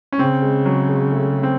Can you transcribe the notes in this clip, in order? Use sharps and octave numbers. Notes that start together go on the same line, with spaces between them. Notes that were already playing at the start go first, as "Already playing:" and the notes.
C#4
C#3 C4
G#3
F#3
G#3
A3
C4